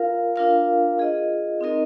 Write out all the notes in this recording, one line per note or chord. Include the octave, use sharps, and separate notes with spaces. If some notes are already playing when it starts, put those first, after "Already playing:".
Already playing: F4 A#4 F5
D4 F4 A#4 F5
F4 G#4 D#5
C4 D#4 A#4 D#5